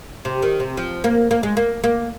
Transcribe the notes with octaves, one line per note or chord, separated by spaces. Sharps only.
C3
D#3
C3
F3
A#3
A#3
G#3
A#3
A#3